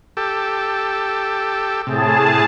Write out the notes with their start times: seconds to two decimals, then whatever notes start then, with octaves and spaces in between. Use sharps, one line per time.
0.17 G4 A4
1.87 A2 C3 G#4 A5